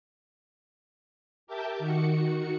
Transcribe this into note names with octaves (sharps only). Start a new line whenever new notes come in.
G4 A#4 E5 A5 D6 G6
D#3 F#4 C#7